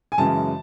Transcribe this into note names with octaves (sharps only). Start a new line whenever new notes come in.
G#5
F#2 C#3 E3 G#3 A5